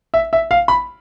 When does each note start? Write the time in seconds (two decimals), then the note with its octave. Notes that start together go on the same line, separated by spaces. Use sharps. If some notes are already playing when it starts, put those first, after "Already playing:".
0.14 E5
0.33 E5
0.51 F5
0.68 B5